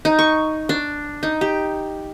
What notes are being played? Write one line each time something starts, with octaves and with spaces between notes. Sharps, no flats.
D#4
C#6
D4
D#4
G4